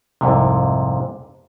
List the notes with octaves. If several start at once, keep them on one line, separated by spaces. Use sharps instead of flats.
C2 F2 G#2 C3